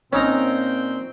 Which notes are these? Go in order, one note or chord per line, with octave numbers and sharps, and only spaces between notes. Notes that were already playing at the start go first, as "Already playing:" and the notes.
A#2 C4 C#4 D#4 A#5